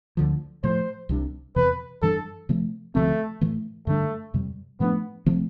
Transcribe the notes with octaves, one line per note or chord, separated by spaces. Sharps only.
D2 D3 F3
A2 F3 A3 C5
C2 C3 G3 D4
E2 C3 E3 B4
G2 E3 G3 D4 A4
C3 F3 A3
D2 C3 F3 A3 C4
A2 E3 A3
G2 D3 G3 A3 D4
F2 C3 G3
A2 F3 A3 B3 D4
C3 F3 A3 C4